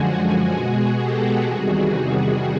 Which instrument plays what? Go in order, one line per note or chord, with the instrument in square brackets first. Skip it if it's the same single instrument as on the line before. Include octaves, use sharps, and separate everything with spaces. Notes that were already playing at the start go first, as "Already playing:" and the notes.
Already playing: [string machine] F#2 D3 F3 G#3 F#4 G#4
B2 G#3 F#4 G#4
G4 A4
E2 C3 D#3 G3 F#4 G#4